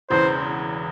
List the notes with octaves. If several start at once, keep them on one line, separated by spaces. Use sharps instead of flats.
E1 E2 C#3 E3 C5